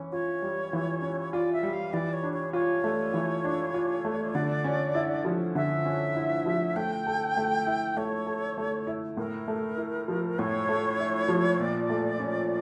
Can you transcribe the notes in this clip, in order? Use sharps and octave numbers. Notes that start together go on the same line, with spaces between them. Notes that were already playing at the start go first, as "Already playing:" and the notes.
Already playing: E3 C#4
F4 C#5
G3
E3
C#4
F4 D5
E5
G3
F5
E3 D5
C#5
D4
C#5
F4 C#5
A3
E3
D4
F4
A3
D3 D5
C#4
E4
F3
D3 E5
C#4
E4
F3
A3 G5
A4
A3
E4
A3 C#5
A4
A3
E4
A2 A#4
A3
E4
F3
A2 C#5
A3
E4
F3
A#2 D5
A3
C#4